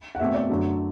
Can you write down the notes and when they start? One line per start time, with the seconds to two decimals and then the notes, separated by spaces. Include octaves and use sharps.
0.15 F#5
0.20 B2 A3 C4 E5
0.34 D5
0.49 F#2 D3 F#3 A3